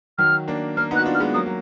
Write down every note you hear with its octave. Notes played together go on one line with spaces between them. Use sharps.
D#3 F#3 F6
A#3 D4
A#3 D4 F6
B3 D#4 F#6
F#4
D4 F4
F6
G#3 B3
F#3 A#3 D#6
F#3